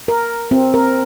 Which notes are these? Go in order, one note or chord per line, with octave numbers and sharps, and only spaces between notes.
A#4
C4
A#4